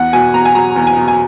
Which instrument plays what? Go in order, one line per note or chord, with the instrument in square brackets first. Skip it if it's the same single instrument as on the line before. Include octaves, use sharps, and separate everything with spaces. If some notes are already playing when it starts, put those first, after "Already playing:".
Already playing: [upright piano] E2 F#5
B2 G#5
E2 A#5
G#5
F#3 A#5
E2
G#5
B2
G#5